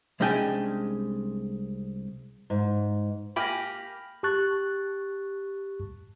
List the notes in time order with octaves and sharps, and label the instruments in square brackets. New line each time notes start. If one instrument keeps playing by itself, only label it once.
[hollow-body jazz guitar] C2 G#3 C#4 D4 G5 G#5
[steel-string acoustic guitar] G#2
[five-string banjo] A#3 G4 G#5 [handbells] B5 F6 A#6
[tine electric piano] G4 A5 C#6 F#6 A6